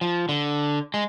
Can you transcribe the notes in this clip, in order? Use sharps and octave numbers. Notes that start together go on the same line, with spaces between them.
F3
D3
G#3